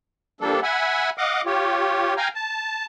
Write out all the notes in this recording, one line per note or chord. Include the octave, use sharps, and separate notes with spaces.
F3 G3 A#3 D4 A4
E5 F#5 G#5 B5
D#5 F5 F#5 D6
F4 G4 C#5
F5 G5 G#5 A#5
A5